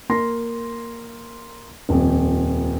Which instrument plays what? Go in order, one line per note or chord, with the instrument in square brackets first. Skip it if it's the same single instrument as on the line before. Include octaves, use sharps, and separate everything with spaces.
[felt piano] A#3 C6 A#6
D#1 F2